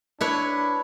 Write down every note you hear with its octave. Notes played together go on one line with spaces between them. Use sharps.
D4 E4 B4 C#5